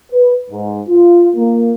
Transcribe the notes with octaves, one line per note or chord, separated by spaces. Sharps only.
B4
G#2
F4
A#3